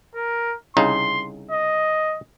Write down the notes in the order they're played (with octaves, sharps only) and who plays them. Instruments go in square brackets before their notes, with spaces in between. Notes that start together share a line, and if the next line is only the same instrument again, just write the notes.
[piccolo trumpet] A#4
[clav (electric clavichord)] C2 C#3 D#4 [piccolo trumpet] C6
[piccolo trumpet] D#5